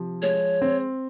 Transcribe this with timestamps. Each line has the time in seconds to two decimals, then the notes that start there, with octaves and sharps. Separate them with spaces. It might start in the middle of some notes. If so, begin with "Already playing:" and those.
Already playing: C3 F3
0.22 G#3 C#5
0.62 C4